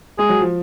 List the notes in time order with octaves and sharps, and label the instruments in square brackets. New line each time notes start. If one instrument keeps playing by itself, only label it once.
[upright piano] G#3 [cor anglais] G#4
[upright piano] F#3
F3